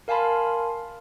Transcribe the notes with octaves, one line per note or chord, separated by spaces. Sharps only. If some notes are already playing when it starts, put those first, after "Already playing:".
A#4 F5 G#5 A5 B5 C6